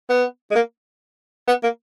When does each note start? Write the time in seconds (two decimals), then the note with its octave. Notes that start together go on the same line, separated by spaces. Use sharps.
0.09 B3
0.51 G#3
0.55 A#3
1.48 B3
1.63 A#3